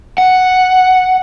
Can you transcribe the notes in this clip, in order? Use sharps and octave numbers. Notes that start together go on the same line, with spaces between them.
F#5